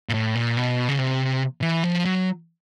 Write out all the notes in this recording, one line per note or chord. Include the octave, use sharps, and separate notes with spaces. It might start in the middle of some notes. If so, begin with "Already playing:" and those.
A#2
A2
A#2
B2
C#3
C3
E3
F3
F#3